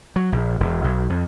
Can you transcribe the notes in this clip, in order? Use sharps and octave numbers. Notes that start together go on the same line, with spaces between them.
F#3
A#1
E1
B1
F2